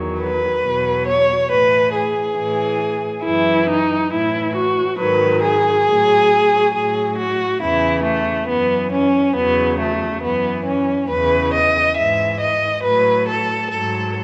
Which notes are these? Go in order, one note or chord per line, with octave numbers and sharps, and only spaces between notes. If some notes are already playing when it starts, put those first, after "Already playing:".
Already playing: E2 D#3 F#3
B4
E2 B2 F#3
C#5
A2 E3 B4
G#4
A2 E3
F#2 E3 E4
D#4
A2 E3 E4
F#4
G#2 D#3 F#3 B4
G#4
A2 F#3
A2 F#3 G#4
F#4
E2 C#3 E3 E4
A3
F#2 E3 B3
C#4
E2 C#3 F#3 B3
A3
F#2 E3 B3
C#4
E2 C#3 E3 B4
D#5
G#2 E3 E5
D#5
A2 F#3 B4
A4
G#2 F#3 A4